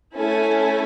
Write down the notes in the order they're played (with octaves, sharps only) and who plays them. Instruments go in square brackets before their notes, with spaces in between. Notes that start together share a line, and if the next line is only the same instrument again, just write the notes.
[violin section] A3 C#4 E4 A4 G#5